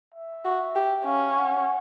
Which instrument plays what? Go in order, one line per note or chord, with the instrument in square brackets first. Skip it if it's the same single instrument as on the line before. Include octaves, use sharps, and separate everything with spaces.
[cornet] E5
[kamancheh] F#4
G4
[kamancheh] C#4 [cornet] F5
[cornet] F#5